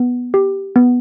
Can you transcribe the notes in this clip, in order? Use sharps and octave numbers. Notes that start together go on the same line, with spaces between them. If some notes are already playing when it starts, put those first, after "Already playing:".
Already playing: B3
G4
B3